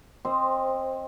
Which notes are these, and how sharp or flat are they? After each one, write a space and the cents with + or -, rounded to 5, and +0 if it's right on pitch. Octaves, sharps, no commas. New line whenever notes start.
C4 +15 C5 +0 D#5 +0